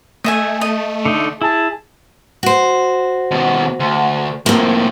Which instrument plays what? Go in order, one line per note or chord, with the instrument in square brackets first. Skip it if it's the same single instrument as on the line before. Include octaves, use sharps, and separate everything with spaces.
[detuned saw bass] A3 [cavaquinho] D#5 E5 G#5
[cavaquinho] D#5
[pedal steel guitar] D3 D#4
[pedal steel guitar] E4 [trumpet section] G#4 A5
[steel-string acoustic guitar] F#4 C5
[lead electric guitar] D#2 B2
D2
[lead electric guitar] F2 A2 [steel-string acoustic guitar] A#3 C4